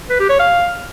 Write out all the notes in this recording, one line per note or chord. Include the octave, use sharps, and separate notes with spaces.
B4
G4
C#5
F5